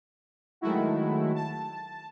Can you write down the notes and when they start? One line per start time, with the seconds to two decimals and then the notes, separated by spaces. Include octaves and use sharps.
0.61 D#3 F#3 G#3 A3 E4 F#4
1.35 A5